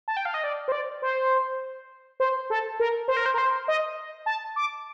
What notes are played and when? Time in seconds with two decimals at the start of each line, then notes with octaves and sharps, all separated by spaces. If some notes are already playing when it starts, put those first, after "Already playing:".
0.08 A5
0.17 G5
0.25 F5
0.34 D#5
0.44 D5
0.68 C5
0.72 D5
1.02 C5
2.20 C5
2.50 A4
2.80 A#4
3.08 C5
3.17 A#4
3.26 C5
3.34 A#4
3.38 C5
3.68 D#5
4.26 A5
4.56 D6